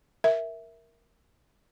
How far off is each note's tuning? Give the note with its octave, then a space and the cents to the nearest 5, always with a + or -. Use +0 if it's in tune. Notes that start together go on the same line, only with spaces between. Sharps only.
A#4 +0 E5 -5